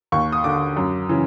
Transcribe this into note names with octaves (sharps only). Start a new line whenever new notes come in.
D#2 C#6
D#6
D3 D6
F#2
C#3 E3